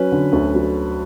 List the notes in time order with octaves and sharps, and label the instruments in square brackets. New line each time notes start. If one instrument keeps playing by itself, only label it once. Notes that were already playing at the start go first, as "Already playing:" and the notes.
Already playing: [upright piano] F#3 C#4 B4
D3
D2
F#3